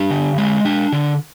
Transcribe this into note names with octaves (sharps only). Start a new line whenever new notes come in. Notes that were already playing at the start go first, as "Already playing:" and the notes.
Already playing: D4 G4
D3
G#3
D4
D3